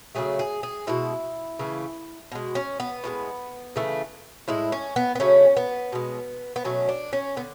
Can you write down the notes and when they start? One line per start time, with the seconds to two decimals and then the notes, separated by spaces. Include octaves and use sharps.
0.15 C#3 F#3 A3 G#4
0.39 G#4
0.63 G#4
0.87 B2 G#3 E4
1.59 C#3 E3 A3
2.32 B2 G#3
2.55 C#4
2.80 B3
3.04 A2 E3 G#3
3.76 C#3 E3 A3
4.48 A2 G#3 E4
4.72 C#4
4.96 B3
5.15 B3
5.20 C#3 F#3 A3 C#4
5.57 B3
5.92 B2 G#3
6.56 B3
6.64 B2 F#3 A3 C#4
6.89 D4
7.13 C#4
7.36 D3 B3